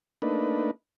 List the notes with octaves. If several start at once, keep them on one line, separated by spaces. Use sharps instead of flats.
A3 A#3 D4 D#4 B4